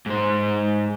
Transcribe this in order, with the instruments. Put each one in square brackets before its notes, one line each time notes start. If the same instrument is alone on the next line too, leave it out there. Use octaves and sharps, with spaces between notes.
[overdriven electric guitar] G#2 C5